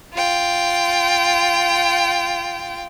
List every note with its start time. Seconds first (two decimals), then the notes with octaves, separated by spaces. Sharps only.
0.14 F4 G5